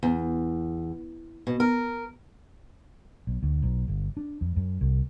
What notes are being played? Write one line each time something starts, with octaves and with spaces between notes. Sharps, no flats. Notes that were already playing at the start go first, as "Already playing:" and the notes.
E2
B2
A#4
B1
D2
B1
G1
D4
F2
F#2
C2